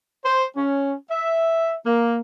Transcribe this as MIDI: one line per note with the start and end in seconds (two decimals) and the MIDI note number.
0.25 0.44 72
0.56 0.93 61
1.10 1.73 76
1.86 2.18 58